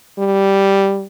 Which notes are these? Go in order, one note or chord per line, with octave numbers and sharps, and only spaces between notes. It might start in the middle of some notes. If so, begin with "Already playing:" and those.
G3